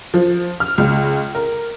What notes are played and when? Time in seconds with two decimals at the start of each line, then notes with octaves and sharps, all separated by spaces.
0.14 F3
0.60 F6
0.78 C#2
1.35 A#4